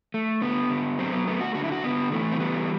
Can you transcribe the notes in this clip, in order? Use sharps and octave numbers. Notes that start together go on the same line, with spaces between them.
A3
D3 B3
D3
F#3 C4
B3
A3 B3
F#4
D3 F#4
E4
F#4
D3 B3
E3 A3
C4
G3 B3